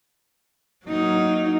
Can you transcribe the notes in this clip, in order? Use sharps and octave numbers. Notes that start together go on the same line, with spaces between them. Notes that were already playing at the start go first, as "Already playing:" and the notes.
F#3 A#3 D#4